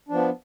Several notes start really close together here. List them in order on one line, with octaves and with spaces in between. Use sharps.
D4 F3 B3